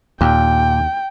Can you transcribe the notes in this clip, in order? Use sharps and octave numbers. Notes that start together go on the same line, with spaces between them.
D#2 A#2 G5